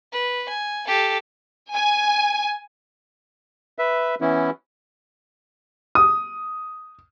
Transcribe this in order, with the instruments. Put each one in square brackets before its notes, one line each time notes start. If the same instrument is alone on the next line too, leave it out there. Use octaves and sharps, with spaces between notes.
[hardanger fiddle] B4
G#5
G4 A4
[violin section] G#5
[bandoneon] B4 E5
E3 B3 C#4 E4
[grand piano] D#6